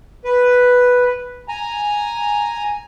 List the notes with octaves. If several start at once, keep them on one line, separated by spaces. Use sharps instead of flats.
B4
G#5 A#5